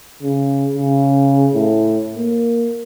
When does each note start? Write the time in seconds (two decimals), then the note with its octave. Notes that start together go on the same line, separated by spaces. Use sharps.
0.22 C#3
0.75 C#3
1.55 A2
2.16 A#3